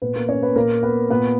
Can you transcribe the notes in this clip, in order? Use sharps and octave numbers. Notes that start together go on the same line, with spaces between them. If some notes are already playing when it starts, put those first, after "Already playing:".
A#2 B3 B4
A#3 A#4
C#4 C#5
B3 B4
A#2 A#3 A#4
B3 B4
A#2 B3 B4